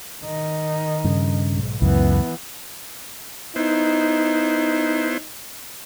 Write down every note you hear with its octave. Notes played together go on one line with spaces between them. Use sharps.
D#3 D#4
G2 C#3
B1 G#2
C#2 F#2 E3 B3
B3 D#4 E4 C5